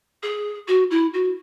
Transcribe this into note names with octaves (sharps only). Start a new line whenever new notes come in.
G#4
F#4
E4
F#4